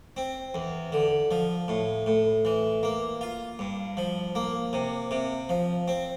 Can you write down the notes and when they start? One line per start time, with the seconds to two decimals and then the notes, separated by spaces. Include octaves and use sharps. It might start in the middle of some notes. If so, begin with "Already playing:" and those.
0.17 C4
0.54 E2
0.92 D3
1.31 F3
1.68 A2
2.06 A2
2.45 E3
2.83 A#3
3.21 F4
3.59 G2
3.97 F3
4.35 A#3
4.73 C3
5.11 C3
5.49 F3
5.88 C4